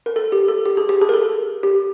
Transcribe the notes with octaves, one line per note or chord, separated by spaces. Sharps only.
A#4
A4
G4
A4
G4
G#4
G4
G#4
A#4
A4
G4